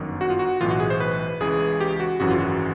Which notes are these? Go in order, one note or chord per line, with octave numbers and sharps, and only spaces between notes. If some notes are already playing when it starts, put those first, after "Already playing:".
Already playing: G1 F#2 D#3
F#4
F4
F#4
B1 A2 E3 F4
F#4
G#4
C5
B4
C#2 C#3 E3 G#4
G4
F#4
G#1 F#2 C#3 E3 F#4
F4
F#4